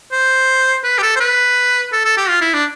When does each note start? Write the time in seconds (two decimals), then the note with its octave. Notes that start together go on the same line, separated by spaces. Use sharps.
0.12 C5
0.84 B4
0.98 G4
1.02 A4
1.16 C5
1.20 B4
1.93 A4
2.05 A4
2.17 G4
2.29 F4
2.41 E4
2.54 D4